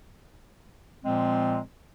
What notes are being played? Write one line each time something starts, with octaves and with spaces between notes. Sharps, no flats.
A#2 F3 G#3 C4